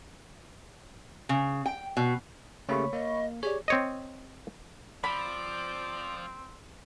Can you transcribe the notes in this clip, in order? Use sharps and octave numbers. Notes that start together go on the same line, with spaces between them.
C#3
G5
B2
C#3 A3 A#3 G4 C#5 B5 C#6
A#3 D#5
G4 G#4 C#5 D5
C4 C#5 D#5
F3 C4 D5 B5